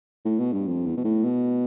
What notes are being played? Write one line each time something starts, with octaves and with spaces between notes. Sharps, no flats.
A2
B2
G2
F2
E2
B2
A2
B2